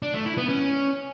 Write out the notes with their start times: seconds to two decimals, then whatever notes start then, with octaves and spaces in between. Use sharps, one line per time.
0.03 D4
0.14 A3
0.26 E4
0.37 B3
0.49 C#4